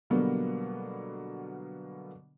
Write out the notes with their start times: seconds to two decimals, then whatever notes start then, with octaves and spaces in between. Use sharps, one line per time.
0.10 B2 D3 F#3 G3 A#3 B3